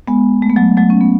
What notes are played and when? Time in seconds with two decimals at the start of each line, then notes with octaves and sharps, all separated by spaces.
0.07 G#3 B3
0.42 A3
0.50 B3
0.56 F#3 A3
0.77 F#3 A3
0.90 C#4
1.01 B3